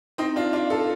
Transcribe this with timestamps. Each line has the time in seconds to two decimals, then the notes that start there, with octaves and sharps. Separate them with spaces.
0.18 C4 D#4
0.36 D4 F4
0.53 D4 F4
0.70 F4 A4